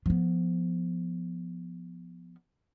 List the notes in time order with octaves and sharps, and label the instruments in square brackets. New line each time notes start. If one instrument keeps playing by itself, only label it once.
[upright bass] F3 B3